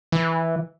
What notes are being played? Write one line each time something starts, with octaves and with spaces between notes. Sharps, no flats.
E3